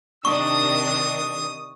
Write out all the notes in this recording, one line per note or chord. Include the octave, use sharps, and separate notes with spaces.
C3 D#3 D4 C#6 D#6